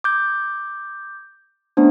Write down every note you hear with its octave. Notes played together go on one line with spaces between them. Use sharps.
D6 G6
A3 B3 C#4 D4 C5